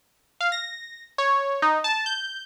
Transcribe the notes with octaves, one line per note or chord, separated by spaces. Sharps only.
F5
A#6
C#5
D#4
A5
G6